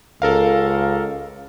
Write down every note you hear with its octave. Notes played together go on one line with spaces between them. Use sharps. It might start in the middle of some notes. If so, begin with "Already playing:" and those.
C#2 A4 A#4 F5